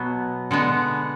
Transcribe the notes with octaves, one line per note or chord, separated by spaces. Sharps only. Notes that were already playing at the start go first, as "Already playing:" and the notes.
Already playing: B2 F#3 B3
D3 G#3 B3